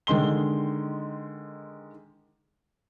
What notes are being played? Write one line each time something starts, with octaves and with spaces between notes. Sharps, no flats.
D3 D#3 G#3 C6 G7